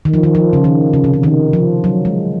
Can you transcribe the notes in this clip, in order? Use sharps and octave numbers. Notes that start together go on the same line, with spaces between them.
D#3
F3
D#3
F3
C#3
D#3
C#3
C3
C#3
D#3
F3
F#3
G#3